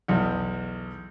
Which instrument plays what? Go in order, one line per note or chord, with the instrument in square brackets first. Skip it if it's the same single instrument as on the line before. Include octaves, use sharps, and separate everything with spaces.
[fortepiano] B1 E2